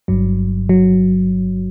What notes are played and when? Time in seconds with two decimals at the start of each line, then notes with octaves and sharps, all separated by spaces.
0.08 G1 G2 F#3
0.69 F#3